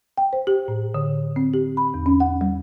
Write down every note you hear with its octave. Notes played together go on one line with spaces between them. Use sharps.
G5
C5
G4
A2
D3
C4
G4
B5
E2
C#4
F#5
G3